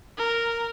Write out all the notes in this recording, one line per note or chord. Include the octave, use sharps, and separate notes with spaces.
A#4